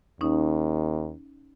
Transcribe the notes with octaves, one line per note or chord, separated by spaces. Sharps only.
D#2 C#4 D#4